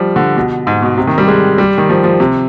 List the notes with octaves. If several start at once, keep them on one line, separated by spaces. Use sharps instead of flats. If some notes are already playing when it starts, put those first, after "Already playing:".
Already playing: F3 G3
D3
B2
G#2
B2
C3
D#3
G3
G#3
G3
D#3
F3
F3
C3